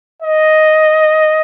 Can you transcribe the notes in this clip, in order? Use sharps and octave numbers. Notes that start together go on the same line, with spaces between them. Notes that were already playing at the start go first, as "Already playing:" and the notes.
D#5